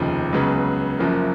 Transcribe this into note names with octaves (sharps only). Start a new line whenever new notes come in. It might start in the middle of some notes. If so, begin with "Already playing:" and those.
Already playing: F1 D#2 C#3 F3
C#2 C#3 F#3 B3
F#1 F#2 F3 A#3